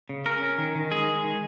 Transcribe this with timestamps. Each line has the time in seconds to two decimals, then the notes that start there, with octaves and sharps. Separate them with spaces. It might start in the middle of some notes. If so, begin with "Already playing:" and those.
0.09 C#3
0.26 C#4 A#4
0.43 C#4
0.58 D#3
0.75 D#3
0.91 G#3 G#4
1.08 G#3
1.24 D#3